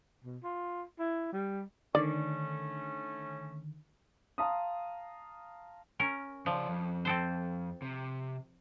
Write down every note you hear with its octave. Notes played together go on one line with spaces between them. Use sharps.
B2
F4
E4
G3
D3 D#3 A3 C#4 D5
F5 A5 A#5 C6 D#6
C#4 A#4
C#3 F3 D5
F2
C4 A4 C5
C3